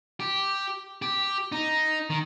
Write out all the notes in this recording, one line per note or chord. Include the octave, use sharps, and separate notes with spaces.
G4
G4
D#4
D#3